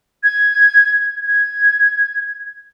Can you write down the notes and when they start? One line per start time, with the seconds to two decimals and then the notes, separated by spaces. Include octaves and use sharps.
0.24 G#6
1.26 G#6